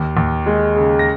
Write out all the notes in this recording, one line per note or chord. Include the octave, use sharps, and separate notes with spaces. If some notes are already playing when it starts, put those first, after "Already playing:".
Already playing: D#2
D#2
G#3
C#3
A#6